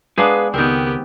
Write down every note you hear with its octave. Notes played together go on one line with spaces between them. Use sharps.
G#3 B3 D4 G#4 B4 F5
C#2 D#3 B3 C4 G4 A#4